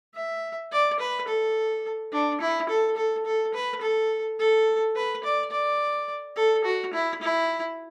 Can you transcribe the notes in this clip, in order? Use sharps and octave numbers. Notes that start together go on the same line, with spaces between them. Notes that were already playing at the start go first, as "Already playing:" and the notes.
E5
D5
B4
A4
D4
E4
A4
A4
A4
B4
A4
A4
B4
D5
D5
A4
F#4
E4
E4